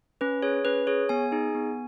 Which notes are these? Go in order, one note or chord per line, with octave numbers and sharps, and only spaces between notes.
C#4 B4
G#4 C#5
C#4 B4
G#4 C#5
B3 G#5
D#4 G#4
B3